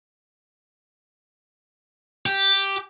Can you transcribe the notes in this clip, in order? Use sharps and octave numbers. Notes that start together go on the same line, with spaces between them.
G4